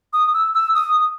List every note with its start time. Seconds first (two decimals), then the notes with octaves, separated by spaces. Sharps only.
0.13 D#6
0.34 E6
0.55 E6
0.75 D#6